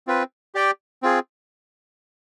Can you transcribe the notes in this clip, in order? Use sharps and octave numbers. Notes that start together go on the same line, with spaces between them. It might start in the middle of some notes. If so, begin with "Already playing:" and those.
C4 F4 B4
G4 D5 G5
C4 F4 G#4